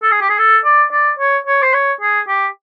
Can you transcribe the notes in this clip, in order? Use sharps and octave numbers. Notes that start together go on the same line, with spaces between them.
A4
G#4
G4
G#4
A4
D5
D5
C#5
C#5
C5
C#5
G#4
G4